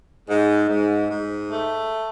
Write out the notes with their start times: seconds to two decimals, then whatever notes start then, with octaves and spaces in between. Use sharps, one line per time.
0.29 G#2
0.69 G#2
1.10 G#2
1.50 A3